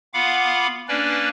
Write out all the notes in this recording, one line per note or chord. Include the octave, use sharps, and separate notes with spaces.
B3 F4 F5 F#5 B5 D6
A#3 C#4 D4 B4 D5